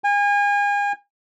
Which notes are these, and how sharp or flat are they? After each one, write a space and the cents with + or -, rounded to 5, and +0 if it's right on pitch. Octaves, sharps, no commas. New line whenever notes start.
G#5 -35